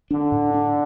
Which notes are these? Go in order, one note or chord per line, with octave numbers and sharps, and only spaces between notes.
D3 D4
A2
D4